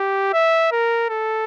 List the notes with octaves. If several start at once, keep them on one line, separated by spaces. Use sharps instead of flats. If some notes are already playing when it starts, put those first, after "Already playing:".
Already playing: G4
E5
A#4
A4